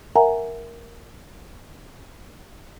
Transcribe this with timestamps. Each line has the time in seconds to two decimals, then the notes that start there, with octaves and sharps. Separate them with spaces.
0.16 A#4 E5 F#5 G#5 A#5